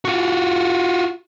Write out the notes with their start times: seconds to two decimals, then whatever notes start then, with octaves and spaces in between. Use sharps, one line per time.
0.05 F4 F#4